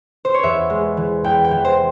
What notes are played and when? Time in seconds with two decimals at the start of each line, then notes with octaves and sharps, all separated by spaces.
0.25 C5
0.34 C#5
0.43 E2 E5
0.70 G#3
0.97 E3
1.24 E2 G5
1.44 G5
1.51 E3
1.65 C5